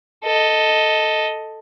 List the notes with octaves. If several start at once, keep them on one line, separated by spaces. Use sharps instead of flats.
A4 D#5